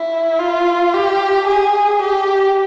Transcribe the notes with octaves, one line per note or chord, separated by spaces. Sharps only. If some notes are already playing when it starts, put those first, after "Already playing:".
Already playing: E4
F4
G4
G#4
G4